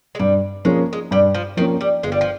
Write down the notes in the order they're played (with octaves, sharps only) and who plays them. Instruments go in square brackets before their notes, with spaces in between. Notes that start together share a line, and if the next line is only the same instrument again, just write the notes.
[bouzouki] G#3
[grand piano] G2 [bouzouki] G3
[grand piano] F3 A#3 C#4 [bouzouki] G#3
[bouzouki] G#3
[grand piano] G2 [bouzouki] G3
[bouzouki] F3
[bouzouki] D#3 [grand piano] F3 A#3 C#4
[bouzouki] G3
[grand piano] G1 [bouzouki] G#3
[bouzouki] G3
F3